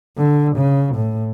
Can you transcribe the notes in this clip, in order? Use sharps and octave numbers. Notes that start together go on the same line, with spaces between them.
D3
C#3
A2